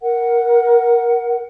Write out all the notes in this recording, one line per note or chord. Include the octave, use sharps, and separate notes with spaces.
A#4 F#5